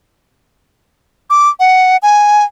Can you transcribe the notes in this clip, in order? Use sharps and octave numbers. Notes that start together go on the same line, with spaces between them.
D6
F#5
G#5